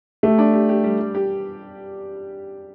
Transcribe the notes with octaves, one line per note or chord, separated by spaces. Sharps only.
A3 G4
D4
G4
G4
G3
G3
G4